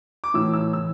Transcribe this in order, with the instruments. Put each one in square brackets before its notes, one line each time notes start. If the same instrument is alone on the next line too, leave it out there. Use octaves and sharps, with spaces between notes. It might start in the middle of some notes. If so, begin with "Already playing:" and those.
[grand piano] D6
A2 E3 E6
E6
E3 E6